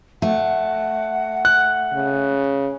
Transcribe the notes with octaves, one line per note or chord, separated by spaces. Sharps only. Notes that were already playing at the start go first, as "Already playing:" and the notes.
A3 F#5
F#6
C#3